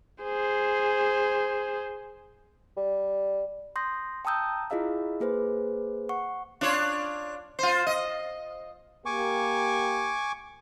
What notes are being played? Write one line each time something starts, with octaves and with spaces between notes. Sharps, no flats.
G#4 C5
G3
C6 D#6 G6 A#6
G5 A5 A#5 D#6 E6 G6
E4 F4 G#4 D#5 F5 E6
A#3 G#4 B4 C5
F#5 C#6
D4 F4 C#5
F4 C5
D#5
A#3 G4 G#5 C#6 D6